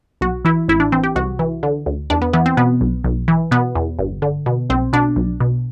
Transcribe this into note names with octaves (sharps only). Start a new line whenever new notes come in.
B1 F#4
E3 E4
A1 E4
D4
E3 C4
G4
C2 F#4
E3
D3
D2
E2 D4
B3
E3 B3
C4
B2 B3
B1
B1
E3
B2 B3
E2
G1
D3
B2
B1 C4
B2 D4
B1
B2